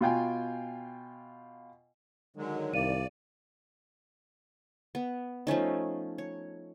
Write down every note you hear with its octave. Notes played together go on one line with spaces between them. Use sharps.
B2 F4 G5 G#5
D3 D#3 F#3 G#3
C2 D5 F5 D#7
B3
F3 A3 C#4 D#4
C#5